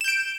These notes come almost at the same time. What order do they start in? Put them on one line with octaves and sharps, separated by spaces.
E7 G6 D7